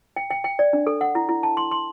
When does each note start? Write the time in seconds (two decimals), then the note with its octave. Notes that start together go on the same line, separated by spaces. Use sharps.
0.16 G5
0.30 G5
0.44 G5
0.59 D5
0.73 D4
0.87 A4
1.01 F#5
1.15 E4
1.29 E4
1.43 A5
1.57 C6
1.71 C6